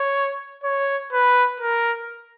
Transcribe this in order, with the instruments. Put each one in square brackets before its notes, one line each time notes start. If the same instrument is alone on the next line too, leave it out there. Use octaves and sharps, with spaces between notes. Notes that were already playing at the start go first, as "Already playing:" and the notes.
Already playing: [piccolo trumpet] C#5
C#5
B4
A#4